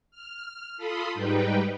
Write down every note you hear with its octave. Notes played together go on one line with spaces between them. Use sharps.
F6
F4 A4 B5 C6 D#6
G#2 G3 D#4 B4 G5